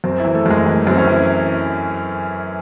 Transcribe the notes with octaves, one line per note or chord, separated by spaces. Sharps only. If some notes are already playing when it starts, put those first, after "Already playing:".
F#2 C4
E4
E3
A3
F#2 G#3
E3
F#2 C4
C#4
E3